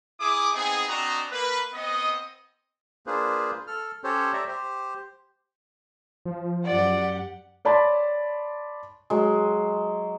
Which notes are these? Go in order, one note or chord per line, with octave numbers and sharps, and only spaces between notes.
E4 G#4 D6 D#6
B3 C4 D#4 G#4
C4 D4 F#4 D#5 A#5
A#3 B4
B3 C4 D#5
A#3 D4 F4 G#4 B4 C5
A4 F6
C#4 G4 A4 C5 C#5
C5 D5 E5 A#5
G4 C5
F3
F#2 G4 D5 F#5
C#5 D5 A5 B5 C6 A6
F#3 G#3